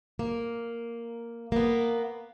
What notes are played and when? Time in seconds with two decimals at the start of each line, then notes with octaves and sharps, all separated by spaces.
0.19 A#3
1.52 A#3 B3